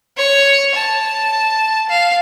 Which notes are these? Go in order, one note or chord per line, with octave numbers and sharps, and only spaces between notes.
C#5
A5
F5